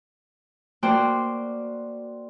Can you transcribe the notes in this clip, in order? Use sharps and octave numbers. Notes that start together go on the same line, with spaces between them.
A#3 F#4 C5 D5 G5